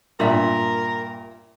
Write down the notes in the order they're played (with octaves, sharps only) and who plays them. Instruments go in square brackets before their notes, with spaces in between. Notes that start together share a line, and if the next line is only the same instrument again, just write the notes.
[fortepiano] G2 A#2 [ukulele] F4 E5 [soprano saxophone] A#4